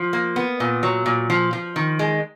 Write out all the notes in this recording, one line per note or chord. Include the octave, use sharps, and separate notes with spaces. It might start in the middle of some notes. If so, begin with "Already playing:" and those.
Already playing: F3
A#3
B3
A#2
F#3
A#2
F3
F3
D#3
G#3